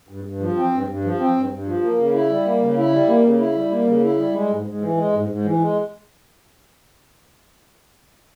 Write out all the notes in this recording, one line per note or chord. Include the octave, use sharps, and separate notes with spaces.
G2
G2
F3
C4
G2
G2
F3
C4
G2
G2
F3
A#3
C#3
E4
G3
A#3
C#3
E4
G3
A#3
C#3
E4
G3
A#3
C#3
E4
G3
G#3
G#2
G#2
E3
G#3
G#2
G#2
E3
G#3